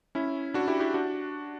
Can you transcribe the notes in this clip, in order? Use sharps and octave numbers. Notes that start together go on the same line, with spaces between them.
C#4 E4
D4 F#4
E4 G4
E4 G4
D4 F#4